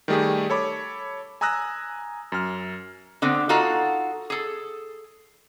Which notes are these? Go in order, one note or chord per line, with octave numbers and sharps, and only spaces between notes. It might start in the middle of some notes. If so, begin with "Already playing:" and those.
D#3 G3 A3 G4 G#4
A4 C#5 B5 D6
G#5 A#5 D#6 E6 F#6 A#6
F#2 F6
D3 B3 C4
D#4 F4 F#4 A4 F#5
G#4 A4